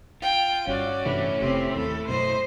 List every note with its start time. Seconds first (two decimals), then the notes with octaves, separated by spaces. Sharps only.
0.22 F4 G5
0.67 G1 C#4 F#4 D5
1.05 G2 C3 E3 A3 E4
1.40 F1 C3 C4 G4
1.76 D#2 A4
2.08 F#2 B2 C5 D#5